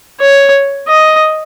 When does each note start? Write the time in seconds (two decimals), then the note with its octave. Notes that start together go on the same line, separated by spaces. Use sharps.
0.20 C#5
0.88 D#5